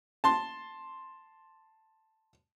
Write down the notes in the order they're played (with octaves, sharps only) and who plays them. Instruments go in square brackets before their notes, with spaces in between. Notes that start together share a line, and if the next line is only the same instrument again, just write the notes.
[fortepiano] A5 C6